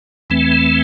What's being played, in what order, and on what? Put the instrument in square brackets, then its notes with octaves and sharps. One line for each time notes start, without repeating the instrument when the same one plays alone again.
[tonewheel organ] E2 E3 A3 C4